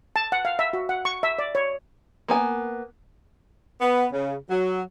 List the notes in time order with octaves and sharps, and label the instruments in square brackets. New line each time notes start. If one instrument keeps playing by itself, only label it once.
[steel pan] A5
F#5
F5
E5
F#4
F#5
C#6
E5
D5
C#5
[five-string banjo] A#3 B3 G#5
[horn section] B3
C#3
F#3